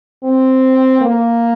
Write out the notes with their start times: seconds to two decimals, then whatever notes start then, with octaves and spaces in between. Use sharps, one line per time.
0.24 C4
1.01 A#3